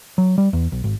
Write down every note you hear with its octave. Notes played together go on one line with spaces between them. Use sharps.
F#3
G3
E2
B1
G#1